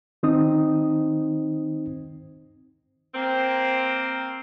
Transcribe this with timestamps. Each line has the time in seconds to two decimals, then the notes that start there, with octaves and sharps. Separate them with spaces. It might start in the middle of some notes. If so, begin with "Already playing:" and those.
0.23 D#3 C4 D#4 C5 D#6
3.14 A#3 C4